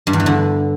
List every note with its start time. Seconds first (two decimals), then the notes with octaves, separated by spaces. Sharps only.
0.07 G2
0.13 E2
0.20 E3
0.26 D3